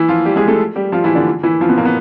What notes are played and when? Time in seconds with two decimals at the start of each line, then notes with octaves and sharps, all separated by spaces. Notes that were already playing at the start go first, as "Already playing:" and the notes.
Already playing: E3 E4
0.09 F3 F4
0.25 G3 G4
0.36 G#3 G#4
0.48 A3 A4
0.76 G3 G4
0.92 F3 F4
1.04 E3 E4
1.15 D3 D4
1.43 E3 E4
1.61 F3 F4
1.69 B2 B3
1.77 A#2 A#3
1.85 B3